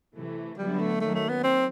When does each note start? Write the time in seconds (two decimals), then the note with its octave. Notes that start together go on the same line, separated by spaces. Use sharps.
0.15 C3 E3 A3
0.58 D3 F#3 G3 B3 E4
0.80 A3
1.00 D#3 F#3 A3 A#3 C#4
1.15 A3
1.29 B3
1.44 C4